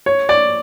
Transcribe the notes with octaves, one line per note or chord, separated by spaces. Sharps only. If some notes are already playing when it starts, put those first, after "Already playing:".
C#5
D5